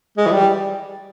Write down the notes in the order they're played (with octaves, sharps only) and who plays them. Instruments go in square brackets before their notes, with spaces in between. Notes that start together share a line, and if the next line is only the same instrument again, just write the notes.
[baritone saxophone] G#3
E3
G3